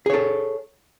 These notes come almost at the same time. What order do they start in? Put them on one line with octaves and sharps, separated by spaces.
G#4 C#5 A4